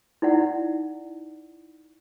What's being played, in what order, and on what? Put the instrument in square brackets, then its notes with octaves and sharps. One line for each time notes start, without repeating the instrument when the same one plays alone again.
[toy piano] D#4 E4 D5 F#5